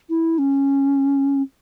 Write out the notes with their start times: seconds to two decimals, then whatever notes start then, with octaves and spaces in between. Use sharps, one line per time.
0.10 E4
0.38 C#4